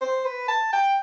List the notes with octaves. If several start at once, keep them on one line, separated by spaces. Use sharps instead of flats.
C5
B4
A5
G5